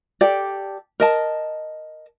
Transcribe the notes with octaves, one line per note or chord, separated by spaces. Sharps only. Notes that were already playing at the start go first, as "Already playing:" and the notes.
G4 A4 D5
A#4 D#5 A5